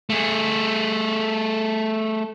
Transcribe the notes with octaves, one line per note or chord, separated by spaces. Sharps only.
A3 G#4